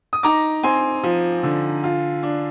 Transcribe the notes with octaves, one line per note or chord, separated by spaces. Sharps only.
D#6
D#4 A#5 D6
C4 G#5 C6
F3
D3
F4
D4